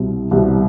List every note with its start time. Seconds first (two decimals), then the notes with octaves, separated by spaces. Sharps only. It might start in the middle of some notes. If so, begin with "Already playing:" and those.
Already playing: C2 B2 G3 C4
0.31 C2 B2 G3 C4